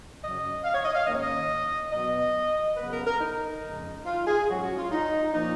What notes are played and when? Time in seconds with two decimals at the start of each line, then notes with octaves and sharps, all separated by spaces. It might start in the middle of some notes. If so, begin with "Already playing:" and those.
0.21 F#2 C#3 F#3 C#4 D#5
0.64 F5
0.74 C#5
0.85 D#5
0.95 F5
1.06 G#2 D#3 A#3 C#4 D#5
1.14 C#5
1.21 D#5
1.92 B2 F#3 B3 D#5
2.77 C#3 F#3 B3 B4
2.92 A#4
3.05 A#4
3.20 D#4
3.63 F2 C#3 G#3
4.05 F4
4.27 G#4
4.47 G#2 F#3 C#4 F#4
4.63 F#4
4.77 F4
4.91 D#4
5.33 A#2 F3 A#3 C#4 D#4